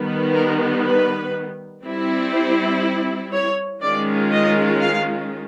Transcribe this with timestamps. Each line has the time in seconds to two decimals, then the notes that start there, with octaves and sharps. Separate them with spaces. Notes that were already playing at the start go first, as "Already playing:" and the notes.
Already playing: D#3 G3 B3
0.35 A#4
0.84 B4
1.85 G3 C4 E4
2.34 C5
3.33 C#5
3.83 D#3 G#3 C#4 F4 D5
4.33 D#5
4.81 F5